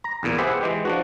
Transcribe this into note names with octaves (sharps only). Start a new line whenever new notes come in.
A#5
B1 E2 A#2
G4 G#4 B4 C5 E5 F#5
E3 G#3 G4
F3 D4 F#4